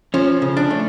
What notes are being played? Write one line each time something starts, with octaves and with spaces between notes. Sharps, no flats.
F3 C#4
C#3
D4
A3